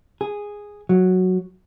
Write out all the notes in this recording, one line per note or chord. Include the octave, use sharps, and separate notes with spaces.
G#4
F#3